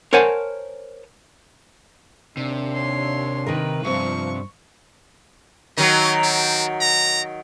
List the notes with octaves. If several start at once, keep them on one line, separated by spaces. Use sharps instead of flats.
A#4 C5 C#5 F#5 G#5 A5
D#2 C3 D4
C#5 C6
D#3 A#4 B4
G2 C3 F3 C4 C#6
D#3 F#3 D#5
C4
A#5